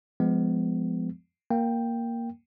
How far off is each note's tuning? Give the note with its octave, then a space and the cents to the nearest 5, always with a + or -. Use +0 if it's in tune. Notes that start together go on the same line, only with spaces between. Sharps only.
F3 +0 G#3 -5 B3 +25
A#3 +0 G5 +0